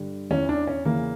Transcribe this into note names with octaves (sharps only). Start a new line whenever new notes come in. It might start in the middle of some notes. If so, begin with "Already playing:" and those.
Already playing: G2 D3
E2 E3 C#4
D4
C#4
E2 C#3 E3 A#3